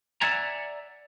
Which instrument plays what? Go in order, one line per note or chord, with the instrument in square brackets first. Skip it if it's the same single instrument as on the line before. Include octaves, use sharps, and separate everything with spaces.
[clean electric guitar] D5 E5 F#5 G#5 A#5